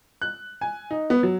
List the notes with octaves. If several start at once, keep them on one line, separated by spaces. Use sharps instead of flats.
F#6
G#5
D#4
B3
F#3